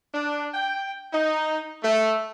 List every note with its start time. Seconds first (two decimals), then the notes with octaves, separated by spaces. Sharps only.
0.13 D4
0.54 G5
1.13 D#4
1.83 A3